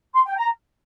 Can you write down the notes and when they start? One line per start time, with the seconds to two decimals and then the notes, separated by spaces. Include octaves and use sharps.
0.13 C6
0.25 G5
0.35 A#5